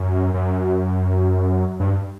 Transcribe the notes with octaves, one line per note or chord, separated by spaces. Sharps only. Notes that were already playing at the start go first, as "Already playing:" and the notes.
Already playing: F#2
F#2
G2